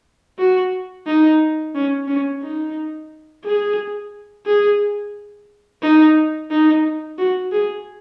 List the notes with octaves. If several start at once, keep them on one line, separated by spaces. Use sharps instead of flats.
F#4
D#4
C#4
C#4
D#4
G#4
G#4
D#4
D#4
F#4
G#4